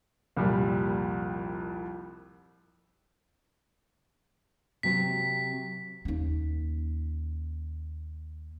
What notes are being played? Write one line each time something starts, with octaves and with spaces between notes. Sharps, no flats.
C2 F2 A#2 G3
C3 F#3 C4 B6
D#2 C#4